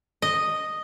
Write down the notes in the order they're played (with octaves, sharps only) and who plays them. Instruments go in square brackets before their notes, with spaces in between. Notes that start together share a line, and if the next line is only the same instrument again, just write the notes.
[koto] D#5